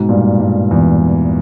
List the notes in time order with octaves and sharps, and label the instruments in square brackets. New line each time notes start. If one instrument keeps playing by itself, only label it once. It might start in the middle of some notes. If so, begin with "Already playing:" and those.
Already playing: [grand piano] G#2 B2
G2 A#2
G2
E2